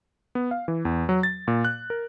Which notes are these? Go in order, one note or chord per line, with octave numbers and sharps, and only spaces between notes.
B3
F5
E3
E2
F#3
A6
A#2
F#6
A#4